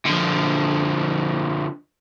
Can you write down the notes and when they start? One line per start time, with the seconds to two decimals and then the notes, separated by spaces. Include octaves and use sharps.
0.06 D3 F3